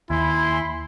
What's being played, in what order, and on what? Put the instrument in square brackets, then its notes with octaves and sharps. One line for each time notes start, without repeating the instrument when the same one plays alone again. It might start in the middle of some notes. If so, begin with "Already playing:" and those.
[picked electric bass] D#2 [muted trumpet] E4 [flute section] G#5 B5 C6